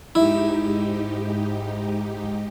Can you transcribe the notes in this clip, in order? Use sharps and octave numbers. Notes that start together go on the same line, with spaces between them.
G#2 D#4 E4 G4